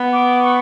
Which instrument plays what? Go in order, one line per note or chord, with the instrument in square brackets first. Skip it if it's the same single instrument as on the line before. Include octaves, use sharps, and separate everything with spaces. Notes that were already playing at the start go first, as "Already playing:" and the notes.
Already playing: [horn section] B3
[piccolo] D6
C#6